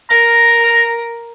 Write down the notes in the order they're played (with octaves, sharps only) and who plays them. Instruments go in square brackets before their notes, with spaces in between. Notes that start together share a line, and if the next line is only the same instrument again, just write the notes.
[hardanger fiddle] A#4 [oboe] A#5